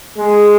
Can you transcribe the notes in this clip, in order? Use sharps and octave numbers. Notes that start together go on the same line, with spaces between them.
G#3